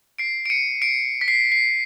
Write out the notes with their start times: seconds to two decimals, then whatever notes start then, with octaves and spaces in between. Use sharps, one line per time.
0.18 C7 D7
0.46 D7
0.50 C#7 D#7
0.82 C7 D7
1.21 B6
1.28 C7
1.52 C7